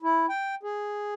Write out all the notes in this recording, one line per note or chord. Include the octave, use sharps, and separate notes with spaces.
E4
G5
G#4